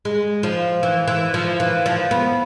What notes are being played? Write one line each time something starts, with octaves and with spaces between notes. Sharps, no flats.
G#3
F3
E3
E3
F3
E3
F3
B3